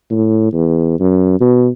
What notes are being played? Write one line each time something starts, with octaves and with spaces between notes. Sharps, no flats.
A2
E2
F#2
B2